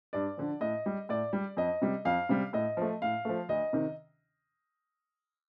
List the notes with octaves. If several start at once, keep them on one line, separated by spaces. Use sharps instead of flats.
G2 D5
D3 F3
A2 D#5
G3
A2 D5
G3
F2 D#5
C3 G3
F2 F5
C3 G3
A2 D#5
F3 A3
A2 F5
F3 A3
D2 D#5
C3 D#3